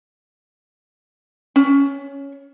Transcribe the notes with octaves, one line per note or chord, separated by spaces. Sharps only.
C#4